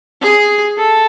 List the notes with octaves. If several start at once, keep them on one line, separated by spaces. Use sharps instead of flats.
G#4
A4